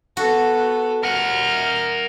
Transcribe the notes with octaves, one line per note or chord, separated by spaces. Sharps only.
B3 F#4 A4
A#4 F#5 F6